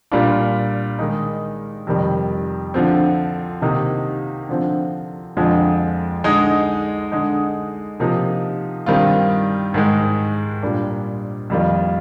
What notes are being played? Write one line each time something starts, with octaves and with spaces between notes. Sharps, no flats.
A#2 G3 D4 F4
D#3 G#3 D#4
F2 C3 D#3 G3
D3 F3 C4
C3 D#3 A#3 D#4
D3 F3 C4
F2 D3 F3 G#3
D3 G#3 D#4
D3 G#3 D#4
C3 F3 A#3 D#4
G2 D#3 G3 C4 F4
G#2 D#3 G#3
A#2 G3 A#3 D4
F2 D#3 G3 A#3 F4